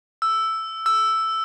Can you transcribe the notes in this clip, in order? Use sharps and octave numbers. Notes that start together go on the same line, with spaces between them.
E6
E6